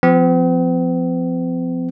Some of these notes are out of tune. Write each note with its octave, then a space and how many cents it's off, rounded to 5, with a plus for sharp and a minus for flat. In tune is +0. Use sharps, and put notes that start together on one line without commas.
F3 +0 C4 -45